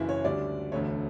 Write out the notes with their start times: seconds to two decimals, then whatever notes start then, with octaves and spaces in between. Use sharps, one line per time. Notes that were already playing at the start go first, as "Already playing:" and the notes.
Already playing: F#1 F#2 C#3 E3 E4
0.09 C#5
0.25 D2 D3 G3 D5
0.72 E1 D2 D3 A3 C#5